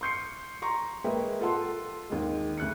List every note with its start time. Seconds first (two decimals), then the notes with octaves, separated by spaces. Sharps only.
0.01 C6 C#6 G6 C7 C#7
0.62 A#5 C6 C#6
1.04 G#3 A#3 B4 E5 G5
1.41 F4 A4 F#5 C6
2.10 D#2 G#3
2.58 D2 F#6 C#7